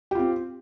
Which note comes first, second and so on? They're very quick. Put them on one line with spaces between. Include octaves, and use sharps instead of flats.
G4 F4 C4